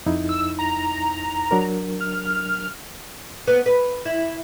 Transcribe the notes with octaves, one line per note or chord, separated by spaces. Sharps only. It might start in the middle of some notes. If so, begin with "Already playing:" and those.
F2 D#4 E4
E6
A#5
F#3 D4 A#4
F6
B3
B4
E4